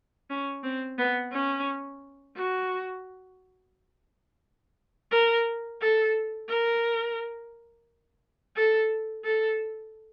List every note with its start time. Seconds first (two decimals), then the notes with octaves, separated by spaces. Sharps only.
0.30 C#4
0.63 C4
0.98 B3
1.32 C#4
2.37 F#4
5.11 A#4
5.81 A4
6.49 A#4
8.56 A4
9.24 A4